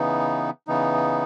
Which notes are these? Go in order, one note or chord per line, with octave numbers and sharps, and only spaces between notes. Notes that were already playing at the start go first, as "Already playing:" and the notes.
Already playing: C#3 E3 B3 D#4
C#3 E3 B3 D#4